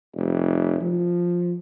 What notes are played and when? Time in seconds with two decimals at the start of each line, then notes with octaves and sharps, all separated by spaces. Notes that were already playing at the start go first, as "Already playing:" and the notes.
0.15 F1
0.81 F3